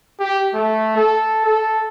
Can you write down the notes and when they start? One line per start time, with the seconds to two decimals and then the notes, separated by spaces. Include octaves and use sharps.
0.20 G4
0.54 A3
0.97 A4
1.46 A4